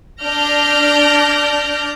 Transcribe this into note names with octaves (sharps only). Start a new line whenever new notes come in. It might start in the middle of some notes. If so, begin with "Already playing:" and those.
D4 D5 F6 G6 A#6